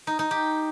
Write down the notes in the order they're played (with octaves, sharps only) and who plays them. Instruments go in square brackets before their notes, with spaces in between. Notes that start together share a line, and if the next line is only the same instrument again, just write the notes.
[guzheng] D#4
D#4
G4